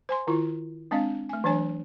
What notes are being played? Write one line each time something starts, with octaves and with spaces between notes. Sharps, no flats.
C5 G#5 C6
D#3 E4 F4
G#3 C4 D4 D#5 F5
A3 G#5
E3 F#3 D4 C#5 G#5